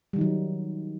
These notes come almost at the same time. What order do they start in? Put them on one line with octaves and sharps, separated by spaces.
G3 D#3 D#4 F#3